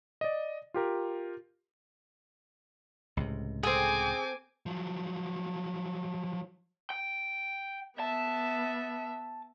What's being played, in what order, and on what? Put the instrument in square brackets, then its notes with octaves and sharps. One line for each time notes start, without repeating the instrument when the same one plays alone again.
[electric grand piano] D5 D#5
F4 G4 A#4
[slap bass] C#2 A2 C3
[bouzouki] C4 A4 [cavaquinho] G#4 [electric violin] G#5 D6
[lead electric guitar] F3 F#3
[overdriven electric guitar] G5
[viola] B3 E5 [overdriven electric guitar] A5